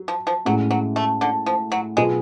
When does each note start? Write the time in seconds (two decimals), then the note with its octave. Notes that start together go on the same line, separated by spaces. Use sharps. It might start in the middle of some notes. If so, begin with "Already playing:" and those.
Already playing: F#3
0.08 F3
0.27 F3
0.46 A2 F#3 G#3 C#4 F#4
0.71 F#3
0.96 A3
1.21 D3
1.46 F3
1.72 F#3
1.97 B2 F#3 G#3 B3 F4 G#4